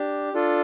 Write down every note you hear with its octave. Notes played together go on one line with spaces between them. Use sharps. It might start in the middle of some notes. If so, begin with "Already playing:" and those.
Already playing: D4 G4
D4 F4 A4